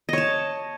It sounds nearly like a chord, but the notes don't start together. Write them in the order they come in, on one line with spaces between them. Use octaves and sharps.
D#5 C#5 A5